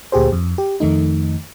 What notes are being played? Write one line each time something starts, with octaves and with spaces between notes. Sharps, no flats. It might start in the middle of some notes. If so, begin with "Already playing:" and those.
D2 A#2 G4 G#4 C5
F2
G4
F2 D#3 A3 D#4